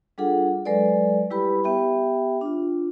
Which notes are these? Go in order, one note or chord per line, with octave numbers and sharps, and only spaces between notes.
G3 D4 F4 G#4 A4 F#5
F#3 G#3 A4 B4 D5
G3 E4 G4 B4 B5
B3 G4 E5 G5
D4 F4